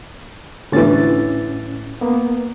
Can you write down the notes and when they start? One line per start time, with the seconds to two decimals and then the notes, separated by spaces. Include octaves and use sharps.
0.72 A2 D3 E3 C#4 A6
2.01 A#3 B3